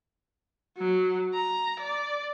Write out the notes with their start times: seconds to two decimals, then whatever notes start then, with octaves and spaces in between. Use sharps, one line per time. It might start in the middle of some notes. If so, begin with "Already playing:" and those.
0.78 F#3
1.34 A#5
1.79 D5